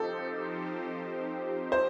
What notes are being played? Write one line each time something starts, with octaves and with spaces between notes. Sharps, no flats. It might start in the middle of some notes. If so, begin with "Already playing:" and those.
Already playing: F3 C4 D#4 G4 A4 C5
C5